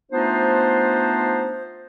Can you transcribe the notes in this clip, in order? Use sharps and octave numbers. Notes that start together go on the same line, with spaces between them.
A3 B3 D4 D#4 F4 C5